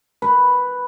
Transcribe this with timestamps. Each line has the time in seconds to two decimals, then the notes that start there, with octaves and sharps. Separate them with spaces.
0.22 B4